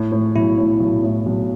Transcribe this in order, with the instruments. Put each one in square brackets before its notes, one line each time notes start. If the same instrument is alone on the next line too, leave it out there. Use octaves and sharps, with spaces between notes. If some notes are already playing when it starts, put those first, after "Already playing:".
Already playing: [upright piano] A2
A2
[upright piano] B1 [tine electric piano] E4
[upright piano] A2
B1
A2
B1